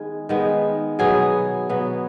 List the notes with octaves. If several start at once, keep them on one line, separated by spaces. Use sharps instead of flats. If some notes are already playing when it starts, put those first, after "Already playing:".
Already playing: D#3 G#3 B3 G#4
D#3 G#3 B3
B2 F#3 B3 G#4
B2 F#3 B3